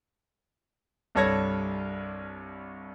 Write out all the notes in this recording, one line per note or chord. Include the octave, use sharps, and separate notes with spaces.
C2 G2 A4 C#5 G#6 A#6